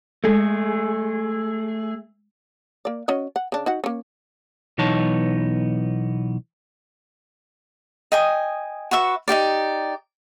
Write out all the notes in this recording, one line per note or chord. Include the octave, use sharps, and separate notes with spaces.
G#3 A3 G#4 A4
A#3 D5
C#4 F#4 D#5
F#5
C#3 D4
D#4 F#4 F#5
A#3 C#4
B1 E3 B3 D#4 C#5 A5
D#5 G5 G#5 D#6
F#4 B4 E5 C#6
D#4 E4 G4 D5